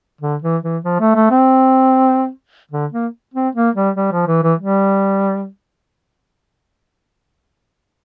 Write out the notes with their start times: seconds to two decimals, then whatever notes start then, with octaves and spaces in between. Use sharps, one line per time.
0.21 D3
0.42 E3
0.63 E3
0.84 F3
1.00 A3
1.15 A3
1.31 C4
2.71 D3
2.92 A#3
3.34 C4
3.55 A#3
3.75 G3
3.97 G3
4.12 F3
4.27 E3
4.43 E3
4.59 G3